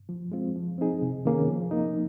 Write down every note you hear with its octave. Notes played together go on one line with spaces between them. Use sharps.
F3
G#3 C4 F4
F3
C4 D#4 G#4
C3
D#3 A#3 C#4 G#4
F3
A#3 D#4